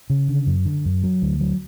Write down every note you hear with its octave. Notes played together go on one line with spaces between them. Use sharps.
C#3
D3
F#2
D3
F#2
F#3
D2
F#3